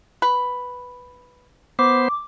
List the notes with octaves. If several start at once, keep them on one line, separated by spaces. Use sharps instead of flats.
B4
B3 C5 D6